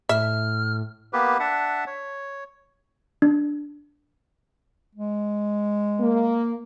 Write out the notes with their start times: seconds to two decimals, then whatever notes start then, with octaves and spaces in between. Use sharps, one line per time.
0.09 A2 E5 F6
1.13 A#3 B3 G4 B4
1.40 D4 E5 F#5 A5
1.87 C#5
3.22 D4
4.95 G#3
5.99 A#3